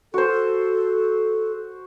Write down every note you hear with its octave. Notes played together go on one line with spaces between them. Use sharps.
F#4 A4 C5